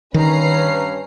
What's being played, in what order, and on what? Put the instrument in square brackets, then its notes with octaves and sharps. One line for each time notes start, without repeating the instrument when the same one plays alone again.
[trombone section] G2 C#4 [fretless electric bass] D#3 [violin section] B4 A#5 C7